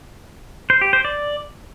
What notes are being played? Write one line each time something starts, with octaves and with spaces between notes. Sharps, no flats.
C5
G4
C5
D5